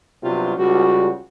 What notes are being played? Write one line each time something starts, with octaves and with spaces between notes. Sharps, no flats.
C2 G2 C3 F#3 B3 F4
C#2 G3 F#4